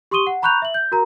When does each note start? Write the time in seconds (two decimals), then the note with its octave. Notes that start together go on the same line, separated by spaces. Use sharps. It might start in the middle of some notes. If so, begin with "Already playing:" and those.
0.11 G4 C6 C#6 D#6 D#7 G7
0.27 F#5
0.42 A#5 B5 C#6 F#6 G6 F7
0.62 E5 F#7
0.74 G6
0.92 F#4 A#4 A#5